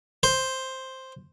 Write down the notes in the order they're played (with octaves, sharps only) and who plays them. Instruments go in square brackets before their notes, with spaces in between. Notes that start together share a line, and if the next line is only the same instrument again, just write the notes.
[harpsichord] C5